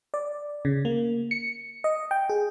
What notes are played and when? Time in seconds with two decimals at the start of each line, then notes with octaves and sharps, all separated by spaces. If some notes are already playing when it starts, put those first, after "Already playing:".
0.14 D5
0.65 C#3
0.85 A#3
1.31 C#7
1.84 D#5
2.11 G5
2.30 G#4